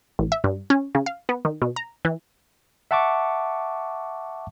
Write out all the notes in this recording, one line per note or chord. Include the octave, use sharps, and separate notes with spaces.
A1
E5
G2
C#4
C#3
F5
B3
D#3
B2
A#5
E3
E5 F#5 A5 C#6 D6